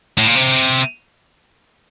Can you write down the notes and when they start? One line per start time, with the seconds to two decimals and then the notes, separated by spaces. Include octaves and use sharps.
0.18 A2
0.27 A#2
0.36 C3